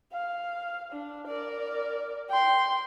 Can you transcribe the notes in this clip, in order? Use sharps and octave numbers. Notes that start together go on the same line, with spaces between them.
F5
D4
A#4 D5
G5 C6